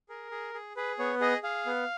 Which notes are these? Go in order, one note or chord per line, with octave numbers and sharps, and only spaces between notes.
G#4 A#4
G#4
G#4
G#4 B4
B3 C#5
G#4 D#5
G#4 F5
B3